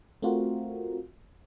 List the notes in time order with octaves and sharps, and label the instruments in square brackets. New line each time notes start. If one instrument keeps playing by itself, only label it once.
[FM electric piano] A3 C4 F4 F#4 A#4